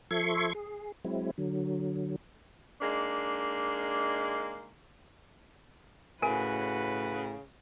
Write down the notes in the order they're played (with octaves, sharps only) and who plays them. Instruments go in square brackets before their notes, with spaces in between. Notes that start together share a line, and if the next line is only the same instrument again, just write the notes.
[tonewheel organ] F3 A4 E5 C6 C#6 G#6
G#4
F#3 G#3 C4 E4
D3 F#3
[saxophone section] G#3 A#3 D4 D#4
[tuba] A2 [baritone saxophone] C#3 [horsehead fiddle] F#4 B4 [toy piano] A#4 G#5